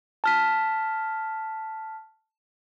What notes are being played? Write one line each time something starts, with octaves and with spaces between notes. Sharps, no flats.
A5 F6 B6